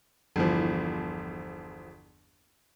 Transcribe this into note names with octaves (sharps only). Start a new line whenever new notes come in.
G1 E2 F3